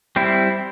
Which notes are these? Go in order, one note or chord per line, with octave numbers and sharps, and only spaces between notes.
G3 C4 E4